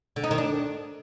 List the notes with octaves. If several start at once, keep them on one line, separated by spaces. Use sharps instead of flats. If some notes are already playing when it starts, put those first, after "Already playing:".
D3
D#4
D#3
D4